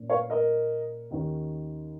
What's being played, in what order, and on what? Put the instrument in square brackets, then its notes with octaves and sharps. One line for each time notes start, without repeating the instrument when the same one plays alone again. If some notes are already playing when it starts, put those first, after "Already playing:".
Already playing: [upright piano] A#2 A#3 C#4
C#5 F5
A#4 D#5
D#2 D#3 C#4